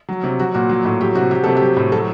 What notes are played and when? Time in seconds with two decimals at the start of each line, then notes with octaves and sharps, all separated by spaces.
0.09 F#3
0.24 C3
0.39 F#3 F#4
0.54 A#2 F#4
0.69 F#3
0.85 A2
1.01 F#3 G4
1.15 C3 F#4
1.31 F#3 G4
1.44 C3 A4
1.57 G4
1.62 F#3
1.77 A2
1.92 F#3 A4